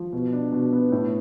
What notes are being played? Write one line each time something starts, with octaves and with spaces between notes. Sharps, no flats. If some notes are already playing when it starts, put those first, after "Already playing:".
Already playing: F3
B2
D4
B2
B3
A2